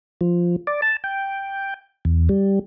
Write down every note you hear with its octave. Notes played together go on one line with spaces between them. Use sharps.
F3
D5
A5
G5
E2
G3